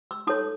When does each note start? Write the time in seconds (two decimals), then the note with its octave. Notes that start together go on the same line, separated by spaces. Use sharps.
0.11 E6
0.27 D#4 A4 C#5 D#6